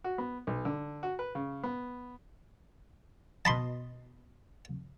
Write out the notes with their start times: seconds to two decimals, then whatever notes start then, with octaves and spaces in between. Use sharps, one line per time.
0.04 F#4
0.18 B3
0.47 B1
0.65 D3
1.03 F#4
1.19 B4
1.35 C#3
1.63 B3
3.45 B2 D#5 A5 B5 C6